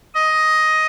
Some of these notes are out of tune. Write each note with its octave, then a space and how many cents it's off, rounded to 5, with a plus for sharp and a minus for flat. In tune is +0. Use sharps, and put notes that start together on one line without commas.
D#5 +10